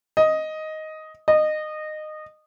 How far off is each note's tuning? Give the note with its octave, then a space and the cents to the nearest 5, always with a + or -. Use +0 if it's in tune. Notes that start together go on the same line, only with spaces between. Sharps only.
D#5 +5
D#5 -20